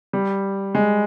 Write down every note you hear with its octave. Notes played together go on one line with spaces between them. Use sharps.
G3
G#3